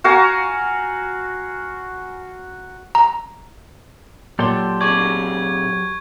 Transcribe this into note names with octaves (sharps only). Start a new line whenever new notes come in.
F#4 F5 G#5 A#5
A#5
A#2 F#3 G4 A4 D5 C6
C3 G#4 D5 C#6 G#6